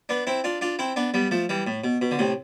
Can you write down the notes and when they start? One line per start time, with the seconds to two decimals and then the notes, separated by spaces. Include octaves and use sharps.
0.09 B3 D4
0.27 C4 E4
0.44 D4 F4
0.61 D4 F4
0.79 C4 E4
0.96 B3 D4
1.14 G3 B3
1.31 F3 A3
1.49 E3 G3
1.67 A2
1.84 B2
2.01 B2
2.11 D3
2.19 A2 C3